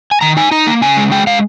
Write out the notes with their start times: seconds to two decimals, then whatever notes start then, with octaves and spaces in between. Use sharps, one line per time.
0.11 G#5
0.21 D#3 A#5
0.37 D#4 G#5
0.51 D#4 A#5
0.67 A#3
0.81 C#3 G#5
0.97 G#3
1.11 G#3 G5
1.27 G#3 F5